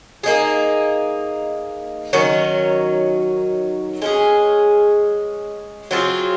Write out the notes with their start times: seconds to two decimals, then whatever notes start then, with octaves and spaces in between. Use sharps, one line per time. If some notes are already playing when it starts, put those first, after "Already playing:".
0.23 A#3 D#4 G#4
2.13 D#3 F#3 C#4
4.02 G#3 C#4 G#4
5.91 F#3 C4 F4 G#4